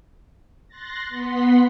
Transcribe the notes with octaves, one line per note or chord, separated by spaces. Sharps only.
C6 F#6 A6 A#6
B3 F#5 C6 B6